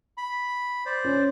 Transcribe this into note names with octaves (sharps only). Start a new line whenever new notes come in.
B5
C5 D5
C#4